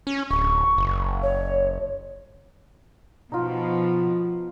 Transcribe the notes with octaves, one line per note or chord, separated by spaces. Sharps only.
C#4
D1 C#6
F#1
C#5
B2 F3 D#4 F4